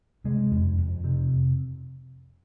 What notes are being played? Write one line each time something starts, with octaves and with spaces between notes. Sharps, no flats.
C3 G#3
F2
F2
C3